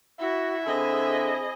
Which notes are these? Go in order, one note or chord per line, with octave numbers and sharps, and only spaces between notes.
E4 F#4 E5
D3 C4 E4 G#4 D#5